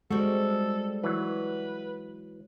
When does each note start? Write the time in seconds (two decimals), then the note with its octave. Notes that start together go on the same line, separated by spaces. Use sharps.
0.11 G3 G#3 C4 F#4 A4
1.03 E3 F#3 B4